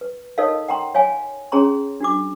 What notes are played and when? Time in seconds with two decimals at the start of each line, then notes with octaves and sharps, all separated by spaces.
0.01 B4
0.38 D#4 A4 A#4 C#5 D#5 F5
0.68 F#5 G5 A#5 C6
0.95 C#5 F5 G#5
1.52 C#4 G#4 C#5 A#5 C6
2.00 D4 F#4 D6